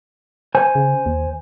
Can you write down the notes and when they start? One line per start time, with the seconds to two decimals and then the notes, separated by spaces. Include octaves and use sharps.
0.55 C5 G#5
0.75 C#3
1.06 D#2